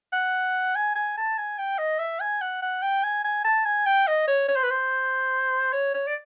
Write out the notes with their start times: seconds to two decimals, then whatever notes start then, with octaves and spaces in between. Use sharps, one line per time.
0.13 F#5
0.76 G#5
0.95 G#5
1.17 A5
1.38 G#5
1.58 G5
1.78 D#5
1.99 E5
2.20 G#5
2.41 F#5
2.62 F#5
2.82 G5
3.03 G#5
3.24 G#5
3.45 A5
3.65 G#5
3.86 G5
4.08 D#5
4.28 C#5
4.49 C#5
4.56 C5
4.63 B4
4.71 C5
5.72 C#5
5.94 C#5
6.07 D5